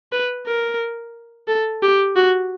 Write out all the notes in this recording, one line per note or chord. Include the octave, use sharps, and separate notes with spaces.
B4
A#4
A4
G4
F#4